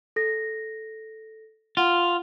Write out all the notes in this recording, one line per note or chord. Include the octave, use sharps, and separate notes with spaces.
A4 A#6
F4 F#5